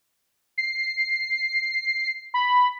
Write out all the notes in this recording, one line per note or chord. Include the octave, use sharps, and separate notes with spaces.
C7
B5